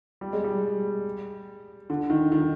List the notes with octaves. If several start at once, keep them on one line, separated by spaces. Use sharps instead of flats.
G3
G#3
G3
D3
D#3
D#3